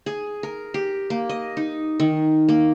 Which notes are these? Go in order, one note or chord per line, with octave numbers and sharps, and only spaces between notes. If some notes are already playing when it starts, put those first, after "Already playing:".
G#4
A#4
G4
A#3
D#5
D#4
D#3
A#3